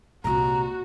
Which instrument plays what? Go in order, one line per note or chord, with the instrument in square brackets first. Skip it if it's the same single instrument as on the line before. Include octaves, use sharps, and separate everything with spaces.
[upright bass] C2 A#2 [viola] F#4 [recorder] A#5